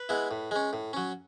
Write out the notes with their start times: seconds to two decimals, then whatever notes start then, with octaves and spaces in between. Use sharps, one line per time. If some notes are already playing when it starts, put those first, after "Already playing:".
Already playing: B4
0.09 G#3 B3 E4
0.31 A2
0.51 G#3 C#4
0.73 A2
0.93 F#3 C#4